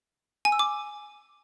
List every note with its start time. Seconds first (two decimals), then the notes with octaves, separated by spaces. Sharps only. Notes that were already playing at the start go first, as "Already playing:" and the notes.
0.45 G#5
0.52 E6
0.59 D6